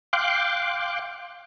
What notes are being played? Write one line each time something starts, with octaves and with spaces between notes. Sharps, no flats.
F5 G5 C6 D6 F#6